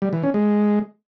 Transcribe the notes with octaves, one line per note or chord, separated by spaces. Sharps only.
G3
E3
C#4
G#3